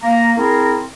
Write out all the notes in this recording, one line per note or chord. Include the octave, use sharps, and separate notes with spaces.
A#3 A#5
C4 E4 G#4 A#4